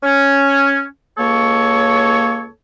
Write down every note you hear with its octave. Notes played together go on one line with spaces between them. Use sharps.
C#4
C#2 A#3 A4 C#5